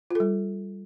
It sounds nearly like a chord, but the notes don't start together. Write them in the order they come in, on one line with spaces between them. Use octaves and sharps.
F4 A4 G3